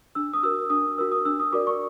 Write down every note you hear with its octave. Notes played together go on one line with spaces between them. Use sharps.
D4 E6
D#6
F#4 A#4 E6
D4 D#6
F#4 A#4 E6
D#6
D4 E6
D#6
F#4 A#4 D5 D6
C#6